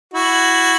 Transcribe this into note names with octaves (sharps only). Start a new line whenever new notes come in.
E4 F#4